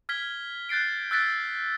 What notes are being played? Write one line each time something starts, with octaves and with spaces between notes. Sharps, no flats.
F6 G#6 B6 G7
F#6 G6 A6 C7 D7
E6 F#6 A6 B6 D7